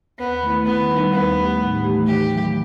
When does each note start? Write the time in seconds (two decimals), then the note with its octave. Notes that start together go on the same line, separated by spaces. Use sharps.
0.19 D#2 B3
0.42 D#3 A3 E4
0.66 D#3 B3
0.89 G3 D#4
1.13 D#2 B3
1.37 D#3 A3 D#4 G4
1.60 A2
1.84 E3 A3 D#4 G4
2.08 D#3 G4
2.31 F#3 A3